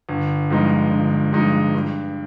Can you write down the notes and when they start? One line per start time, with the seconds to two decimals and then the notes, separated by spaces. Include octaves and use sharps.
0.09 G1
0.50 G2 F3 G#3 D#4
0.92 G1
1.33 G2 F3 G#3 D#4
1.74 G2